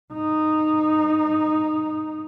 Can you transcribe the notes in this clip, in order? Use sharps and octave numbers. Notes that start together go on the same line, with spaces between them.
G#2 D#4